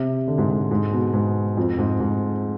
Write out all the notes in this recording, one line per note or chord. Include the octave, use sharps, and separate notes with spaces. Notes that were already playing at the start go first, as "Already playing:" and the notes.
Already playing: C3
D3
G#2
G#2
G#2
B2
G#2
F2
G#2
G#2